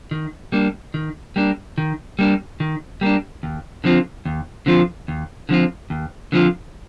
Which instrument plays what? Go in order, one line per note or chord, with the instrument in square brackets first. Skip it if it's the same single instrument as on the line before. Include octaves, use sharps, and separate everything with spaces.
[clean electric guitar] D#3
G3 A#3 D4
D#3
G3 A#3 D4
D#3
G3 A#3 D4
D#3
G3 A#3 D4
D#2
D3 F3 C4 F4
D#2
D3 F3 C4 F4
D#2
D3 F3 C4 F4
D#2
D3 F3 C4 F4